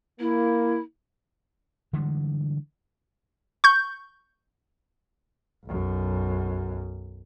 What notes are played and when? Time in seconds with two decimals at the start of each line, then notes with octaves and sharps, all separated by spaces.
0.20 A#3 E4
1.93 D3 E3 G3 G#3
3.64 C#6 G6
5.66 B1 F#2